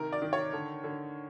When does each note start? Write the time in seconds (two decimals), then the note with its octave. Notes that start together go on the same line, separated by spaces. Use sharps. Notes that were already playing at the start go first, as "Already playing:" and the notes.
Already playing: C3 D#3 A#4
0.13 D5
0.22 D#3
0.33 C#5
0.53 D3
0.84 D3